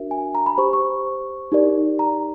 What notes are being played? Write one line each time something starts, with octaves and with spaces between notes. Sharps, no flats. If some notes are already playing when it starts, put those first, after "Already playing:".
Already playing: D4 F#4 A#4 E5
G#5
A#5
B5
G4 C5 C#6
C#6
D#4 G4 A#4 D5
A#5